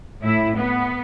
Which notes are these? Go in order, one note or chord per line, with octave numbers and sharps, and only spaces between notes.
A2 E4
B3